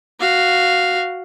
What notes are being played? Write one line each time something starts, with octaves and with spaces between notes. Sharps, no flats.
F#4 F5